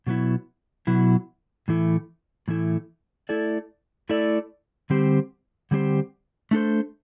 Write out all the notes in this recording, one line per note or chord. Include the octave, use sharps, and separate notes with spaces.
B2 F#3 B3 E4
B2 F#3 B3 E4
A2 E3 A3 E4
A2 E3 A3 E4
A3 E4 A4 D5
A3 E4 A4 D5
D3 G3 C4 G4 C5
D3 G3 C4 G4 C5
A3 D4 A4 C5